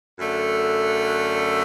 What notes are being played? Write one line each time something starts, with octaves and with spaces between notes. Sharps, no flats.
F#2 D3 A3